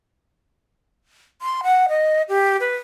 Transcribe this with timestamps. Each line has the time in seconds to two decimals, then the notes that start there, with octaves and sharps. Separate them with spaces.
1.42 C6
1.63 F#5
1.89 D#5
2.29 G4
2.60 B4